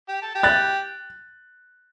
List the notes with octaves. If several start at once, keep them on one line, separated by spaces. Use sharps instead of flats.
G4
A4
G4
F#6 A6